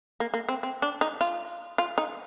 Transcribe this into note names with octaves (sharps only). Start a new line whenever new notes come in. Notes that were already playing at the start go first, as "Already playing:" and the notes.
A#3
A#3
C4
C4
D4
D#4
F4
F4
D#4